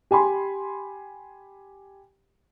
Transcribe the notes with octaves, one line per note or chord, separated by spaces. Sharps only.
G4 G#5 B5 C6